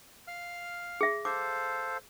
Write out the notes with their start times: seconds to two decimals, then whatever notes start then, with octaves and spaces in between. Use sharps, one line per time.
0.28 F5 F6
1.01 G#4 E5
1.25 A4 C5 F5 D6